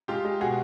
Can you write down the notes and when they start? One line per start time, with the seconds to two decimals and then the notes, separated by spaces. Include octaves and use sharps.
0.08 G#3 F4 G4
0.25 G#3
0.40 B2 F#4 G#4